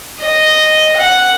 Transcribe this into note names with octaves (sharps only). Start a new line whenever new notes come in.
D#5
F#5